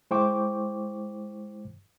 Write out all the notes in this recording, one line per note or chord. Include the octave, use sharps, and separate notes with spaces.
G#3 E4 C5 G5 C#6 D6